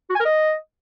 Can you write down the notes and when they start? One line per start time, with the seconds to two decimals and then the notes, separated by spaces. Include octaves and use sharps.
0.10 F#4
0.15 G#5
0.20 A#4
0.26 D#5